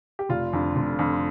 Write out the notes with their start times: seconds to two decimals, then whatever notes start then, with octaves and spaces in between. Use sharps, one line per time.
0.19 G4
0.29 F1 F4
0.53 F2 D3
0.76 F1
0.99 F2 D3